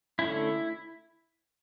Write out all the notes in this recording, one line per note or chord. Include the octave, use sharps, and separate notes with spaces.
D3 A3 C#4 E4